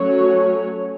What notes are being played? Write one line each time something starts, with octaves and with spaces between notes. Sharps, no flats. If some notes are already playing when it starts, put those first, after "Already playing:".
Already playing: F#3 A3 C#4 F#4 C#5